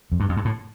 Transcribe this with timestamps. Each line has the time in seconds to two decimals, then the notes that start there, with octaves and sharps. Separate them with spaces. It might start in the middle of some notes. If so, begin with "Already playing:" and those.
0.12 F2
0.20 G2
0.29 F2
0.37 G2
0.45 A2